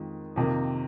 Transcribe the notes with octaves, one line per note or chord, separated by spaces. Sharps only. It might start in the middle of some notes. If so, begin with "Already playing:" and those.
Already playing: F2 D#3 G#3
F2 C3 D#3 A#3